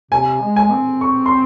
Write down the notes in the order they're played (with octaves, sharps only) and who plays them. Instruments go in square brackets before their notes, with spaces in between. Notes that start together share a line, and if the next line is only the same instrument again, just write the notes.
[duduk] C3 [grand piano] G#5
[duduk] G#3
[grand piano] G#5
[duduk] C4
[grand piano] C#6
C6